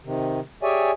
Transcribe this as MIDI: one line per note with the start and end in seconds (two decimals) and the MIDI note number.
0.04 0.40 48
0.04 0.40 51
0.63 0.91 67
0.63 0.91 68
0.63 0.91 73
0.63 0.91 74
0.63 0.91 76
0.63 0.91 80